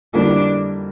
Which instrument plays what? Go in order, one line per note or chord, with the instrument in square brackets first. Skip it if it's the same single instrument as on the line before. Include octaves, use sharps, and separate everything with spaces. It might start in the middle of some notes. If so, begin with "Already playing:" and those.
[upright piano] F2 D3 G3 A#3 E4 [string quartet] D4